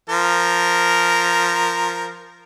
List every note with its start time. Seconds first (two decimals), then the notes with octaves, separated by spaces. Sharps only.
0.09 F3 A#4